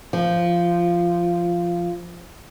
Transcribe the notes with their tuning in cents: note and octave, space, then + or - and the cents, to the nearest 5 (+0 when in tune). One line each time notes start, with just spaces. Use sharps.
F3 -10